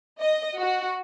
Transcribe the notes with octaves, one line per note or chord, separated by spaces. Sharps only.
D#5
F#4